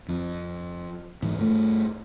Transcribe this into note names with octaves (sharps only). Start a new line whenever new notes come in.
F2
G#2 E3
G2 A3